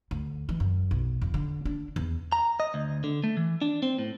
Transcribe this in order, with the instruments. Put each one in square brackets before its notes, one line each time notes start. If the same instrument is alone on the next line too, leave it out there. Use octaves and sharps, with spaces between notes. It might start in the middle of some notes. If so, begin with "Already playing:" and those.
[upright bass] D2
E3
F#2
B1
F2
D3
D4
E2
[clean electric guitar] A#5
D#5
D2
D3
A3
E3
D4
C4
A2